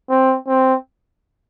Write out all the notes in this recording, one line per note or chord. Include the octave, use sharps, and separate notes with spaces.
C4
C4